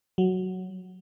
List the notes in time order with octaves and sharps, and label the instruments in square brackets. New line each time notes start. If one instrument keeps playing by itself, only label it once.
[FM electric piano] F#3